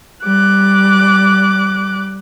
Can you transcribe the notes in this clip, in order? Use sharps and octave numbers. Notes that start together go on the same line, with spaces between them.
G3 D6 F#6